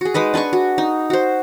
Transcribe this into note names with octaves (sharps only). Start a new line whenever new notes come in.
F#4 G#4
G#3 D#4 B4 D#5
D4 B4 G#5 C#6
F#4
D#4
F#4 C5